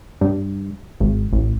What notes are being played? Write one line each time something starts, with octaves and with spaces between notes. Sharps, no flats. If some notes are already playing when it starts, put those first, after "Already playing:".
G2
G#1
A1